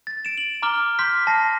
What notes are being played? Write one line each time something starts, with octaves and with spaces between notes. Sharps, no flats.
A6
D7 E7
F#7
A#5 D6 F6 G7
C6 D6 F6 G6 B6
A5 A#6 C7